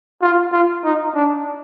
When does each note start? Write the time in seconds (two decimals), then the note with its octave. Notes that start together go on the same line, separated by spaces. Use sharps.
0.22 F4
0.52 F4
0.84 D#4
1.15 D4